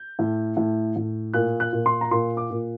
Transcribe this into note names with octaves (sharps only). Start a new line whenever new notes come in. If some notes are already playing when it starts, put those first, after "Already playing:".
Already playing: G6
A2
A2
A2
A#2 F#6
F#6
A#2
C6
A#5
A#2 C6
D6
A#2